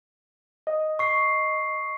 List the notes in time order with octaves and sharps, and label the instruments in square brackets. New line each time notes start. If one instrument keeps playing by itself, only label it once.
[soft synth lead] D#5
[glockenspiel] C#6 C7